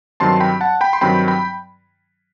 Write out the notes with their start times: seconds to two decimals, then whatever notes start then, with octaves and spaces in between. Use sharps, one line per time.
0.20 G2 D#3 F#3 C4 A5 C6
0.40 G5 B5
0.61 F#5 A5
0.81 G5 B5
0.93 C6
1.01 G2 D#3 F#3 C4 G5 B5
1.28 G5 B5